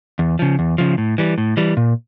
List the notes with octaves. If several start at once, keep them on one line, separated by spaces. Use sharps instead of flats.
E2
C#3 F3
E2
C#3 F3
A2
E3 G3
A2
E3 G3
A#2